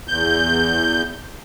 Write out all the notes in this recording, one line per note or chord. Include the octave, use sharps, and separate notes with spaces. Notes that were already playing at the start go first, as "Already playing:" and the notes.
E2 G6